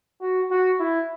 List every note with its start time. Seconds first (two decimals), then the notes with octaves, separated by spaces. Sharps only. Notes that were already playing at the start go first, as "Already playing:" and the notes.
0.21 F#4
0.51 F#4
0.80 E4